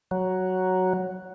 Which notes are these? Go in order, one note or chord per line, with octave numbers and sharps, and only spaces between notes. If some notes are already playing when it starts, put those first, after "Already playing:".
F#3